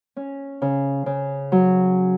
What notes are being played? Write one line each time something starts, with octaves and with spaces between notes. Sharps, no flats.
C#4
C#3
C#3
F#3